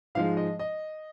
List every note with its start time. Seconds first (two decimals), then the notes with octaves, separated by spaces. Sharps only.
0.15 G#2 F3 G#3 F5
0.37 D#5
0.59 D#5